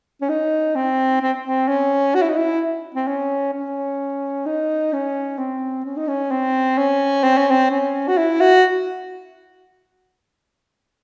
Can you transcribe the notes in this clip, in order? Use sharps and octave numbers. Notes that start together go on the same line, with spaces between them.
C#4
D#4
C4
C4
C4
C#4
F#4
E4
D#4
E4
C4
C#4
C#4
D#4
C#4
C4
C#4
D#4
C#4
C4
C#4
C4
C#4
C4
C#4
F#4
E4
F#4